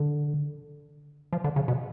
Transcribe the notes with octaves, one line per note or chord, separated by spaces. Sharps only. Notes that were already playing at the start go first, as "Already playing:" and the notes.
Already playing: D3
F3
D3
C#3
B2